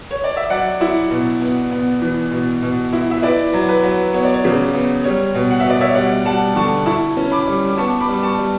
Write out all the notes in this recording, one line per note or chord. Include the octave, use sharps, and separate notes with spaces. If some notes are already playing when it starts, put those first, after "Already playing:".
C#5
D5
E5
F#3 D5 F#5
E4
B2
B3
B3
E3
B2
B2
E4
E5
E4 B4 D5
F#3
B4
F#3
B3 C#5
D5
C#5
C#3
B3
G3 C#5
B2
F#5
E5
B2 D5
C#5 E5
G3 D5 F#5
G3 F#5 A5
D3 A5 C#6
E4 A5 C#6
C#4
B5 D6
G3
D6
B3 A5 C#6
B5 D6
G3
A5 C#6
G3